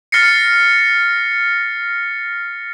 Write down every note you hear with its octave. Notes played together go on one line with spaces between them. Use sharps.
F6 A6 A#6 C7 C#7